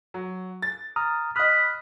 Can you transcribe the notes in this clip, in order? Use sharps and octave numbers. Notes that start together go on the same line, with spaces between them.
F#3
A6
A#5 D#6 F6
D#5 B5 D#6 F6 F#6